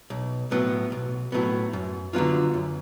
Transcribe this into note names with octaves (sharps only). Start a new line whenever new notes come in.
B1
A2 F#3 B3
B1
A2 F#3 B3
F#2
D3 F#3 B3 F4
F#2